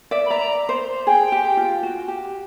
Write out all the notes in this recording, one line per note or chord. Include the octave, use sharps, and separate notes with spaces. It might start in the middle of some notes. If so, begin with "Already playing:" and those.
D5 E5
B5
D5 E5 A#5
C5
G#4 G5
G4
F4
F#4
G4